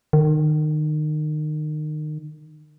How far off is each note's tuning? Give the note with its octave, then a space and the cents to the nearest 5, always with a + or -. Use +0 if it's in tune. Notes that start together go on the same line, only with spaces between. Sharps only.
D#3 -30